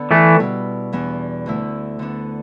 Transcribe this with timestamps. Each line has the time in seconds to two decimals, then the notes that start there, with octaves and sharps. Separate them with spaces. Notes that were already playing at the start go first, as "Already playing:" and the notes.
Already playing: D3 B3 D4
0.11 E3 A3
0.39 B2 G3 E4 B4
0.93 E2 E3 B3 D4
1.46 D2 D3 A3 E4
1.99 D3 B3 D4